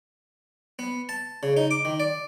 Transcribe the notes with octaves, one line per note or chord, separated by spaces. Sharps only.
B3
A5
C#3
D#4
D6
D#3
D5